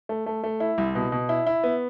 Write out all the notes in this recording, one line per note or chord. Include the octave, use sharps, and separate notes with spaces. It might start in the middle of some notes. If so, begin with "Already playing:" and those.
A3
A3
A3
E4
C2
B2
B2
E4
E4
B3